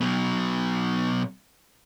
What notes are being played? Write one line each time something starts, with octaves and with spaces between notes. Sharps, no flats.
B2 F#3